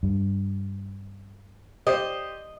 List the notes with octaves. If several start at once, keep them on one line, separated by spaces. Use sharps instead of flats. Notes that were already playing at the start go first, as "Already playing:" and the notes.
G2
G4 C5 D5 D#5